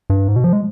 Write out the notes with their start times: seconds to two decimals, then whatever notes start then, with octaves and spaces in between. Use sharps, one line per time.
0.10 G2
0.28 G#2
0.36 B2
0.44 F3
0.53 G#3